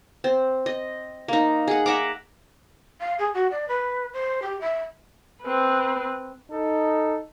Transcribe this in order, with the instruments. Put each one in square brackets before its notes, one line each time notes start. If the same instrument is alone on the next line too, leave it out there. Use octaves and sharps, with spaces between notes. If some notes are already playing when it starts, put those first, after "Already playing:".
[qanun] C4
D#5
A#3 D#4
G#4 F#5
E5 F#5 A#5 D6
[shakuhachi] F5
G#4
F#4
D5
B4
C5
G4
E5
[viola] C4 B4
[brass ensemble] D#4 A4